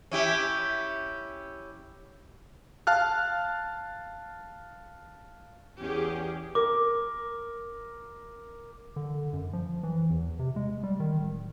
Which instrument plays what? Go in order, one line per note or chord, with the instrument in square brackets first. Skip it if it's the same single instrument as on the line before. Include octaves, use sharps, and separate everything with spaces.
[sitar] C#4 E4 G4
[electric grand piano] F5 A5 F6 F#6
[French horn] E2 [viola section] C#4 G4 G#4
[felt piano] A#4 [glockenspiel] D6
[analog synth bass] D3
F#2
F3
E3
E2
C3
G#3
G3
D#3
D1